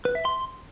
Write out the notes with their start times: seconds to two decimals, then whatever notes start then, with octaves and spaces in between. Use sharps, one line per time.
0.05 B4
0.15 E5
0.25 C6